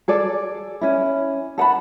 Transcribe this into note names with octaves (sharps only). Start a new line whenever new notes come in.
G#4 A4 D5
C#4 E4
A4 F#5 A5 B5